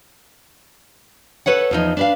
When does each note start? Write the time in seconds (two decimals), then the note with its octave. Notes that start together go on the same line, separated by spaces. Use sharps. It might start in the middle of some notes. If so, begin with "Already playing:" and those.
1.46 A4 B4 C#5 F#5
1.71 E2 F3 D#4
1.97 D4 B4 F5